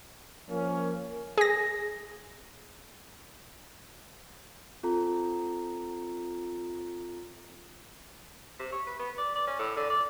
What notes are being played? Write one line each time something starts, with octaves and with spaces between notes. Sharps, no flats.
F3 A#3 C#4 A#4
G#4 A#6
C4 F4 A4 A#5
C3
C#5
B4
B3
D5
D5
C#4
A2
D3
D5